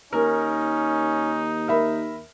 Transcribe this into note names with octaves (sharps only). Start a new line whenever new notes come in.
D#2 C#4 D#4 A#4
A#4 E5 B5